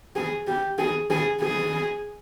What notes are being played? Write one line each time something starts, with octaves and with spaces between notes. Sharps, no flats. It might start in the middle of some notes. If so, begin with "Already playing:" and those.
G#4
G4
G#4
G#4
G#4